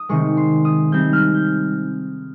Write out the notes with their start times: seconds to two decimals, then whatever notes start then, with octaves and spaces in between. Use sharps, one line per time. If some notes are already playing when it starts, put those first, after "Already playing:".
Already playing: D#6
0.09 C3 D#3 G#3 C#6
0.37 C6
0.65 D#6
0.92 C3 G3 C4 D#4 G6
1.13 F6
1.34 G6